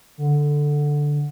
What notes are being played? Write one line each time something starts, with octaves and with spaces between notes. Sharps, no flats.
D3